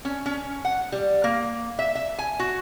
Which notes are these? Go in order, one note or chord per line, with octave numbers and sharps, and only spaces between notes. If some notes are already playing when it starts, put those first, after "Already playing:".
C#4
C#4
F#5
G3
A#3
E5
E5
G#5
F#4